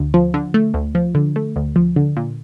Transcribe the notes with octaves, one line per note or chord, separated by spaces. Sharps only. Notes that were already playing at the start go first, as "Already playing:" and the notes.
Already playing: D2
F3
D3
A3
D2
F3
D3
A3
D2
F3
D3
A#2